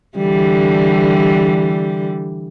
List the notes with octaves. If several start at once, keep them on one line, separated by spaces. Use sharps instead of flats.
D3 E3 G3